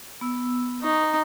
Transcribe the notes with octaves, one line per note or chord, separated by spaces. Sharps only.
B3 E6
D#4 A#5 C#6